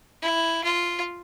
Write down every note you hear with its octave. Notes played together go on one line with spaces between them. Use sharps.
E4
F4